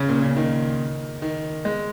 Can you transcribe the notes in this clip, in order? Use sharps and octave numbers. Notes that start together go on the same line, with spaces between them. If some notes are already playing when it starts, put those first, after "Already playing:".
Already playing: C#3
A#2
C#3
D#3
D#3
G#3